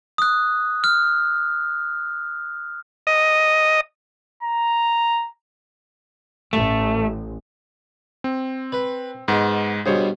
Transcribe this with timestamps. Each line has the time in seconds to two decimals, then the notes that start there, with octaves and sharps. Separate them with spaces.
0.18 D#6 F#6
0.84 F6
3.07 D#5
4.43 A#5
6.53 A1 A3
8.24 C4
8.72 B4
9.28 G#2 G#3 B3
9.86 G2 B2 G#4 C5 C#5